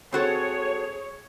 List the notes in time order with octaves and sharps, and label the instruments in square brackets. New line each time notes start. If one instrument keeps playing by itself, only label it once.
[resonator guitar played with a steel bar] C4 F#4 A4 [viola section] G#4 C#5